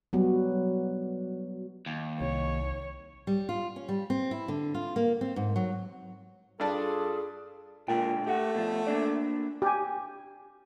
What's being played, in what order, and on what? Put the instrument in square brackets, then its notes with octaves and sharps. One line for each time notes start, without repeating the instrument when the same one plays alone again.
[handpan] F#3 G3 B3 F#4
[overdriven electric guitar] D#2
[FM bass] C2 [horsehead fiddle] C#5
[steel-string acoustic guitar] G3
F4
C#4
G3
C4
E4
D3
F4
A#3
C4
G#2
F#3
[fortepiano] G2 D4 A5 [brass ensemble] F4 A4 [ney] G#4
[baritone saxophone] A#2 [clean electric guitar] D3 G#3 G5
[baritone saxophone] A3 [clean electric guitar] G4 F#5
[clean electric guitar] B2 F3
A#3 D4 D5
[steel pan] G4 G#5